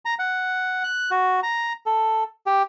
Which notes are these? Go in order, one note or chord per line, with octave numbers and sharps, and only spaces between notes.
A#5
F#5
F#6
F#4
A#5
A4
G4